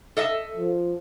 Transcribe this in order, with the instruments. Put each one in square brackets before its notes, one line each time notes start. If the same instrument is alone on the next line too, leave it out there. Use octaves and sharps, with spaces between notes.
[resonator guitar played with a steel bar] A4 D#5 E5
[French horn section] F3